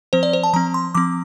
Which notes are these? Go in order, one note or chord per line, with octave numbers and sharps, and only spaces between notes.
F3 C4 C5
D5
C5
A5
F3 C4 A#5
C6
F3 C4 D6